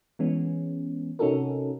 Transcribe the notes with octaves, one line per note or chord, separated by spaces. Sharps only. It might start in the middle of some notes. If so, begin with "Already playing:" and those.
E3 G#3 B3 C#4
C3 C#4 D#4 F#4 A4 A#4